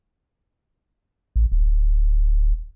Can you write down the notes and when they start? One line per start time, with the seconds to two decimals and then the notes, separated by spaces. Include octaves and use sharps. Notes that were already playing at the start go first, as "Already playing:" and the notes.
1.36 A1
1.52 D1